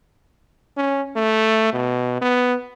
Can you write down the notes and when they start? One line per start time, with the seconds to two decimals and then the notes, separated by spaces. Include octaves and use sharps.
0.77 C#4
1.16 A3
1.73 B2
2.21 B3